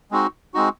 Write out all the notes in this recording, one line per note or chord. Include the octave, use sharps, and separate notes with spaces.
G#3 C4 D#4 F#4
G#3 C4 D#4 F#4